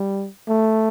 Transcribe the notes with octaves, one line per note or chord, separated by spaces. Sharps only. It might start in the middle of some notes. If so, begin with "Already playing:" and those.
Already playing: G3
A3